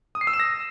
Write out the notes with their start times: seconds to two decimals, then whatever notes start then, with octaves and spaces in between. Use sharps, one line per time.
0.15 D#6
0.21 C7
0.27 E6
0.33 E7
0.40 A#6